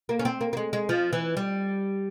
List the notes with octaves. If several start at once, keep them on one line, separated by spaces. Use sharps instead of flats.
A#3
C#4
C4
A#3
A#3
G#3
G#3
F3
E3
G3